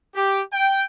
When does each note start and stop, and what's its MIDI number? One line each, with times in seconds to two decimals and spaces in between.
0.16 0.42 67
0.53 0.84 79